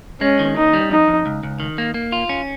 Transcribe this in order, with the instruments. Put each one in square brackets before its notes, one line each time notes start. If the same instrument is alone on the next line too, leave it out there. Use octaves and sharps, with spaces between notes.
[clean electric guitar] G#3 [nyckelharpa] C#4
[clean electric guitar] D#3
[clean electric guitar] D#2 [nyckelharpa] D#4
[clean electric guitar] G3
[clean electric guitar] F2 [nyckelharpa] D#4
[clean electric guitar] F2
C#2
C#2
D#3
A#3
A#3
F4
C#4